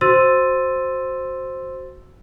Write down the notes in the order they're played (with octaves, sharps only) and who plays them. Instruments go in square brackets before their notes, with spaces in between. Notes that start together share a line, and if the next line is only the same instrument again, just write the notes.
[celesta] F#4 C5 C6 E6 A6 D#7